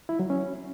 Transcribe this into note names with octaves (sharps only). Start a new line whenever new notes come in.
E4
F#3
C#4